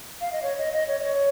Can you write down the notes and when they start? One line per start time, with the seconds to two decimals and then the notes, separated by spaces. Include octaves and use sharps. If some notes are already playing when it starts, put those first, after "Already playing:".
0.21 F5
0.33 D#5
0.43 C#5
0.59 D#5
0.73 D#5
0.88 C#5
1.00 D#5
1.04 C#5